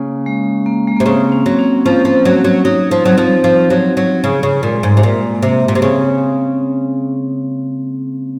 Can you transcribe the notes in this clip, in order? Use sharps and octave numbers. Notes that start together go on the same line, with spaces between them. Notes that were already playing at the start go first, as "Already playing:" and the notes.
Already playing: C#3 A#3 C#4
G#3
A#3
G#3
C3 A#3
C#3 C4
C#4
F#3 C4
C#4
F3 C#4
F3
F#3
F#3
F#3 D#4
F3
F#3 C4
F3
F3
F#3
F#3
C#3
C#3
A#2 G#3
G#2
C3
A#2 A#3
A#3
C3 C4
A#2
C3
C#3 C4